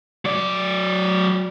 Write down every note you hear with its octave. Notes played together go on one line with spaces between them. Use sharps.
F#3 D5